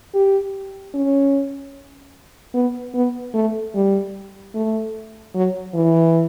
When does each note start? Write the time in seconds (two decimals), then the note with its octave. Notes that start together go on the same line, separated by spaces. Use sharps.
0.14 G4
0.94 C#4
2.54 B3
2.94 B3
3.34 A3
3.75 G3
4.55 A3
5.35 F#3
5.74 E3